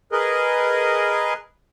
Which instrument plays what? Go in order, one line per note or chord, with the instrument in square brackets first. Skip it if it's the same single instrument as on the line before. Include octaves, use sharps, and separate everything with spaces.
[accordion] G#4 A#4 B4 D#5